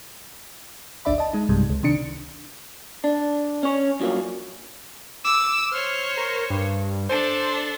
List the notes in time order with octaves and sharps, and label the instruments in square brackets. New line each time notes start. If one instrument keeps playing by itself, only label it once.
[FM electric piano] G#1 D2 D4 D5 E5 B5
D#5 A5
G#3 D#4
B1 G2 C3 G3 G#3
C#2
C3 D#3 D4 C#7
[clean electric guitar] D4
C#4 C#5
G2 F3 F#3 A#3 C#4
[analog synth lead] D6 [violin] E6
[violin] C5 C#5 [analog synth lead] F6
[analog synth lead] A#4
G2
[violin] D4 A4 [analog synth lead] C5